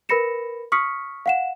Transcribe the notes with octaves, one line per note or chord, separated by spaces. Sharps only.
A#4 B4 B5 A#6 C#7 E7
C#6 D#6 F6 B6 C#7
F5 F#5 E7